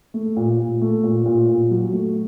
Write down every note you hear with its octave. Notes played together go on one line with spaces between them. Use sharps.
A3
A#2
A#2
A3
A#2
A#2
A#2
F#3
A3